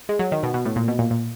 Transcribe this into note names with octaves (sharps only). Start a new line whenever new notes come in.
G#3
F#3
D#3
B2
B2
A2
A#2
B2
A#2
A#2